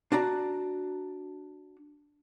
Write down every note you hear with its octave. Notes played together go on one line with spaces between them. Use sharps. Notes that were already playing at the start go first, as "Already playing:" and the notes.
D4 F#4 D5 A#5